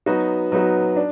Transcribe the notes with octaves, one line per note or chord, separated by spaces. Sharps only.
F#3 B3 D#4 F#4
F#3 B3 D#4 F#4
D4